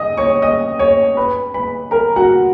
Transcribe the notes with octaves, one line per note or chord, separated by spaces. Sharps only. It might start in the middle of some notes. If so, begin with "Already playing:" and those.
Already playing: D#5 D#6
C#5 C#6
D#5 D#6
C#5 C#6
B4 B5
B4 B5
A#4 A#5
F#4 F#5